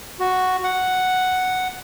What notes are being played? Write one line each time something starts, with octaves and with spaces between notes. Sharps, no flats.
F#4
F#5